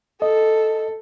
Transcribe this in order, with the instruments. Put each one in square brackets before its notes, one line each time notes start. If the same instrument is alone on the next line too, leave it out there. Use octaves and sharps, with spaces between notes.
[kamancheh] A4 [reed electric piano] D#5